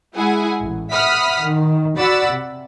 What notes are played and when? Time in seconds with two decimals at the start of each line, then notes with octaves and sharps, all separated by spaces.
0.15 G#3 E4 G#4 F#5 G#5
0.60 A1
0.92 E5 F#5 B5 D#6 F6 B6
1.42 D#3
1.98 F#4 D5 F#5 B5 E6
2.30 C3